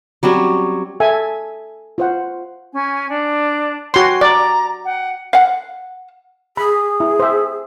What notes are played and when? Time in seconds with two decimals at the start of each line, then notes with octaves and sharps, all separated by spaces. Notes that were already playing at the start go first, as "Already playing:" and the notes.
0.23 F#3 G3 C4 C#4
1.00 A4 E5 G#5
1.98 F4 C5 F#5
2.73 C#4 G#5
3.10 D4
3.94 F#4 C#5 G5 G#5 C6
4.21 D5 A#5
4.84 F#5 G5
5.33 F5 F#5
6.57 G#4 B5
7.00 E4
7.20 C5 E5